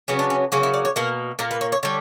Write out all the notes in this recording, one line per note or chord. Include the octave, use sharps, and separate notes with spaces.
C#3 F#3 B3 C#4
D4
C#4
C#3 F#3 A#3 C#4
E4
D5
C#5
B2 A#3 A#4
A#2 A#3 A#4
B4
C#5
C#5
D3 G3 C#5